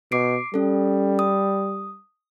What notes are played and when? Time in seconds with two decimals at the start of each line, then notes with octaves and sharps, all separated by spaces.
0.12 B2 D6 C7 D7
0.54 G3 C#4 A4
1.19 D#6